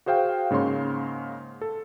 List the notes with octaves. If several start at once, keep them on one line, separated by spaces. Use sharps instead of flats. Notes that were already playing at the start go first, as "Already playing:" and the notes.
F#4 G#4 C5 F5 G5
G#2 C#3 A#3 C#5 C6
A4